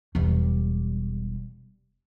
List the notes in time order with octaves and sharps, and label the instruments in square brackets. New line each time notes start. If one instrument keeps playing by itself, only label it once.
[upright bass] E1 G3